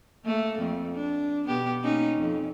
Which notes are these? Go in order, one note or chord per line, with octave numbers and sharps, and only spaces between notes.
A3 A#3
F2
D4
B2 B3 G4
A#3 C#4 D#4
F2